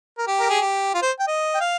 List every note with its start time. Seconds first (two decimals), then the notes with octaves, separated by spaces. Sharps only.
0.18 A#4
0.27 G4
0.40 A#4
0.50 G#4
0.61 G4
0.94 F4
1.02 C5
1.19 G5
1.27 D#5
1.55 G5
1.60 F5